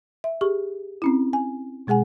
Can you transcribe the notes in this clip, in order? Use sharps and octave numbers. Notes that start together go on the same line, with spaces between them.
E5
G4 G#4 C#6
C4 C#4 E4
G#5
B2 G#3 G#4 F#5 G#5